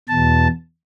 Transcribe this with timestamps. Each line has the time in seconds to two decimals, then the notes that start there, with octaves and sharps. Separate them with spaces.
0.09 E2 B2 A5